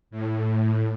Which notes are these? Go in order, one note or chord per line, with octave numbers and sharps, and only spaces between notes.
A2